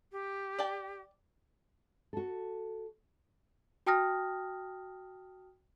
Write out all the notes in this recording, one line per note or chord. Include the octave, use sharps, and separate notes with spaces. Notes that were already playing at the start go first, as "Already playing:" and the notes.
G4
D5 G5 A5
F#4 A4
F#4 G5 A5 D#6 F6 A#6